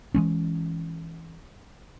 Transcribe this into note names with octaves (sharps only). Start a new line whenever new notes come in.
E3 G#3 C#4